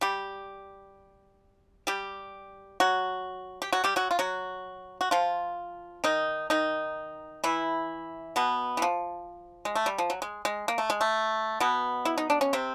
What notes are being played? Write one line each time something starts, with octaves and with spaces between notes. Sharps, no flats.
G3 G4
G3 G4
F#3 F#4
G4
F#3 F#4
G3 G4
F#3 F#4
F4
F#3 F#4
F#4
F3 F4
D#3 D#4
D#3 D#4
E3 E4
B2 B3
E3
F3
G#3
A3
G3
F3
F#3
G#3
G#3
A#3
A3
G#3
A3
B2 B3
E4
D#4
D4
C#4
C3 C4